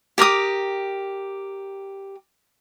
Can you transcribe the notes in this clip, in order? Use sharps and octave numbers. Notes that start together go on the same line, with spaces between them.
G4 A#4 D6 D#6